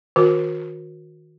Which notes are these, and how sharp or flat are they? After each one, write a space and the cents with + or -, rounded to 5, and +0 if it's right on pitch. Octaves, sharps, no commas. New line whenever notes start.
D#3 +10 F#4 -30 A#4 +10